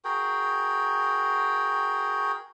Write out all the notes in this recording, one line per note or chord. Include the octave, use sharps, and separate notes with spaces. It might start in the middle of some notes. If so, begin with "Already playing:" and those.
F#4 G#4 A#4 G5